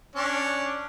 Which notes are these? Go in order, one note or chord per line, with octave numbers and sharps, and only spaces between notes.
C#4 D4